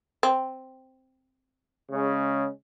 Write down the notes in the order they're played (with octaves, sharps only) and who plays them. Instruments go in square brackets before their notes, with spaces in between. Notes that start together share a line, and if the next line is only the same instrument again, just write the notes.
[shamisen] C4
[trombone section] C#3 G#3 C#4